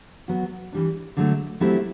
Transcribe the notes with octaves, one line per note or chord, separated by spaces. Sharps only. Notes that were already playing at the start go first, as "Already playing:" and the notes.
F#3 B3 F#4
E3 G3 D4
D3 F#3 A3
F#3 A3 C4 E4 G4